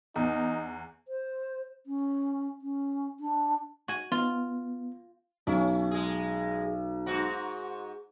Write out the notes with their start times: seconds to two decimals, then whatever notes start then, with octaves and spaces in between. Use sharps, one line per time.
0.16 E2 D#4
1.08 C5
1.86 C#4
2.62 C#4
3.20 D4
3.88 F#4 G#5
4.12 B3 F4
5.47 B1 C#4
5.91 G#3 G#4
7.06 G#2 F#4